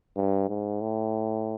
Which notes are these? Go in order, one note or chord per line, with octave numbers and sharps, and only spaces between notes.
G2
G#2
A2